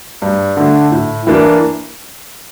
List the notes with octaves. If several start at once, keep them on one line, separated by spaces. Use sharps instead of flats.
G2
D3 A3 D4
A2
E3 A#3 D4